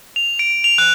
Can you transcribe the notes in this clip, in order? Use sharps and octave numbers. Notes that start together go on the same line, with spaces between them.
F7
D7
F7
F#6